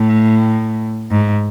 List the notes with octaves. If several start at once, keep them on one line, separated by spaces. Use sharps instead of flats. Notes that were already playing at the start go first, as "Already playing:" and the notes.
Already playing: A2
G#2